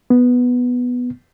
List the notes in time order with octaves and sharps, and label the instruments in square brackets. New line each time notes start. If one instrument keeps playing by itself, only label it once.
[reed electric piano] B3